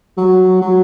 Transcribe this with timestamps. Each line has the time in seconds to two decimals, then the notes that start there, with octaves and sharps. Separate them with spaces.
0.17 F#3
0.62 F#3